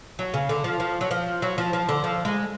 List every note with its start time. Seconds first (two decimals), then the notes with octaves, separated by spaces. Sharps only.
0.19 F#3
0.34 C#3
0.49 D3
0.64 F3
0.80 F3
1.01 F#3
1.11 F3
1.42 F#3
1.58 F3
1.73 F3
1.89 D3
2.04 F3
2.25 G#3